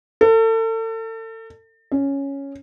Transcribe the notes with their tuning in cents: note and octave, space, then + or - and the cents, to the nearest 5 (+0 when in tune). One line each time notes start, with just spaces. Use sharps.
A4 +35
C#4 +0